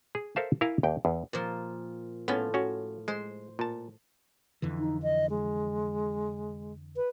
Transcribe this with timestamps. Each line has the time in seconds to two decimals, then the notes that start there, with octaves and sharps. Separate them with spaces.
0.15 G#4
0.36 A4 A#4 C5 E5 F5 A5
0.61 E4 A#4 F5 G#5 A#5
0.83 D#2 G5
1.05 E2
1.33 A#2 F3
2.28 A2 B3 C#4 F4
2.54 C#4 F#4
3.08 G#3 C5
3.59 A#2 A5
4.62 F2 D3 E3
4.78 D#4
5.02 D#5
5.30 G#3
6.96 B4